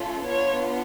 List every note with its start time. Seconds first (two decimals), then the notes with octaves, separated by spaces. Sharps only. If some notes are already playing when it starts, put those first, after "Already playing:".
Already playing: A3 C#4 F4 A4
0.26 B3 D4 F4 C#5